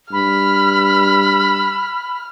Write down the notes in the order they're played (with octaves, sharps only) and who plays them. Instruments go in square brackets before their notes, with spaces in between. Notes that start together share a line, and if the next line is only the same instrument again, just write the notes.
[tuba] G2 [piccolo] B5 [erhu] F6